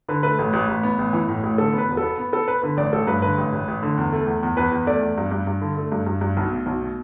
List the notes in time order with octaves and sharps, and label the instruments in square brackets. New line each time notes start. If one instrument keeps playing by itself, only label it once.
[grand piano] D3 B4
A3 B4
A1
A1
A1
B3
A1
E3
A2
A1
D3 A4
B3
B4
E1
A4
B3
B3
B3 A4
B3 B4
D3 B4
A1 D5
A1 A4
G2 B4
D3 B4
A1
A1
A1
D3
E2
A3
E2
E2
E2 B4
E2
A3 D5
E2
G2
G2
G2
D3
A3
G2
G2
G2
B1
B2
B1
B2